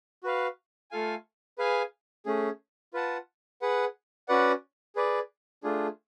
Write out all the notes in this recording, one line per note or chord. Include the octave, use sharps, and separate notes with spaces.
F#4 B4 F5
A3 F4 A4 F5 G#5
G#4 B4 F5 G#5
A3 C#4 G#4
F4 B4 F#5 A5
G#4 B4 F#5
C#4 F#4 B4 D5 F#5
G#4 B4 D5
A3 D4 F4 G#4